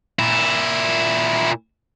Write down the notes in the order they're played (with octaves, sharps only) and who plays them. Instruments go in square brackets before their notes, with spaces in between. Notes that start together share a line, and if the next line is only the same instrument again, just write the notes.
[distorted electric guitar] A#2 E4